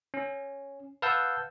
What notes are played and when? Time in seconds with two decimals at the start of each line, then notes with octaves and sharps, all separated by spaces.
0.14 C#4
1.02 B4 F5 F#5 A5 E6 G6